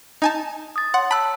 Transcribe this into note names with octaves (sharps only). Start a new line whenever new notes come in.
D#4 G#5 A5
D#6 A6
C#5 F#5 C6
A5 B5 E6 F#6